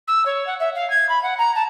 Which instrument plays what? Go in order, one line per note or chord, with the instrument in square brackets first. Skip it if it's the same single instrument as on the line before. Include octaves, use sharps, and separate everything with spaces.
[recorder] E6
C#5
F#5
E5
F5
G#6
B5
F#5
A#5
A5